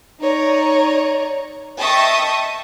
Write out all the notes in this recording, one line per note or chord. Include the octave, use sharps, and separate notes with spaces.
D#4 C#5 D5 A#5
D#5 E5 G5 A5 C#6 D#6